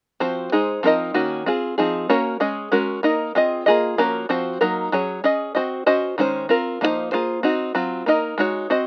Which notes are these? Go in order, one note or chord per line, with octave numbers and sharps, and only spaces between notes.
F3 C4 F#4 C5
G#3 D#4 G#4 C5
F3 C4 D#4 A#4 D#5
D#3 A#3 C#4 F#4
C4 F4 G#4
F3 C4 D#4 G#4
A#3 C#4 F#4 A#4 C#5
G#3 C#4 G#4 D#5
G#3 C#4 F#4 A#4
A#3 D#4 A#4 D#5
C4 F4 G#4 D#5
A#3 F4 G#4 D#5
F3 A#3 C#4 F#4 A#4
F3 C4 F#4 C5
F#3 A#3 D#4 A#4
F#3 C#4 G#4 C#5
C#4 G#4 D#5
C4 F#4 C5 D#5
C#4 F#4 C5 D#5
D#3 G#3 C#4 F#4 C5
C4 F4 A#4
F3 A#3 D#4 F#4 C5
A#3 F4 G#4 C5
C4 D#4 F#4
F#3 C4 F4
A#3 D#4 A#4 D#5
G#3 D#4 F#4 C#5
C4 F#4 C5 D#5